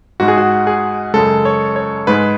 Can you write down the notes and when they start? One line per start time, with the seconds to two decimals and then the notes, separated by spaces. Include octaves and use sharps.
0.20 G#2 G#3 F#4
0.28 G#4
0.37 F#4
0.67 G#4
1.14 F#2 C#3 G#3 A4
1.45 C#5
1.76 C#5
2.07 G#2 G#3 B4